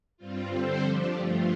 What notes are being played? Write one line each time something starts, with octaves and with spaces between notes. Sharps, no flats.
G2 G3 C4 F4
D3 G3 C4 A4 C5
F3 D4 G4
G2 F3 A3 F4